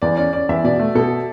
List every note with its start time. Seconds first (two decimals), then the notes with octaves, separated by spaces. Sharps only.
0.02 E2 D5
0.17 C#4 D5
0.33 C#4 D5
0.49 E2 E5
0.64 B2 D5
0.79 A3
0.95 B2 A4